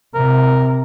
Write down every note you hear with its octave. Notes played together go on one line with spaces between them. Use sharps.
C3 A#4